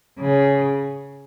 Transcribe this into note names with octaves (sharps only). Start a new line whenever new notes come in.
C#3